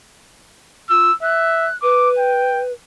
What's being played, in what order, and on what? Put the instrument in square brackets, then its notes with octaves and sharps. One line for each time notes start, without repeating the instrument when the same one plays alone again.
[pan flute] F4 [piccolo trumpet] E6
[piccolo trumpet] E5 [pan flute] F#6
[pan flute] B4 [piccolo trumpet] D6
[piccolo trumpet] G5